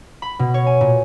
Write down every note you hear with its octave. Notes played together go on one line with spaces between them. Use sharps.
B5
B2
C#5
G#5
A#2